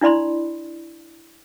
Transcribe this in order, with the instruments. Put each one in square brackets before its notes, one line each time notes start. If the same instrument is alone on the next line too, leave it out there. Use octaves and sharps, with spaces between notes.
[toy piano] D4 E4 D5 B5 C6